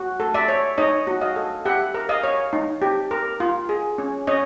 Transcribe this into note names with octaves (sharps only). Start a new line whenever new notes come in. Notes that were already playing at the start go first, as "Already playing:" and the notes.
Already playing: F#4
A4
D5 E5
C#5
D#4 C#5 D#5
F#4
D#5 F5
A4
G4 E5 F#5
A#4
D#5 F5
C#5
D#4
G4
A#4
F4
G#4
C#4
C#4 C#5 D#5